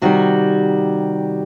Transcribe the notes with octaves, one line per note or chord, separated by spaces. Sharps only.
C3 D#3 G3 F#4